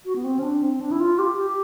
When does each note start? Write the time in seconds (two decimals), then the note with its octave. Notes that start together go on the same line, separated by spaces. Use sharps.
0.06 F#4
0.16 B3
0.24 C4
0.39 C#4
0.43 D4
0.63 C4
0.81 D4
0.91 E4
1.00 F4
1.19 G4
1.37 G4